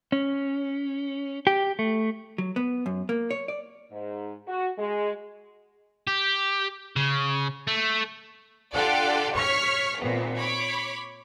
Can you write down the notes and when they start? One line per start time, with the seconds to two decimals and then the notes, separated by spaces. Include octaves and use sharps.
0.12 C#4
1.47 G4
1.79 A3
2.38 F#3
2.56 B3
2.86 F#2
3.09 A#3
3.31 C#5
3.48 D5
3.92 G#2
4.48 F#4
4.78 G#3
6.07 G4
6.96 C#3
7.67 A3
8.75 D4 F4 G4 A4 D5 F#5
9.35 C#5 C#6 F6 B6 C#7
9.99 G#1 A#2 B3
10.38 C#5 B5 D6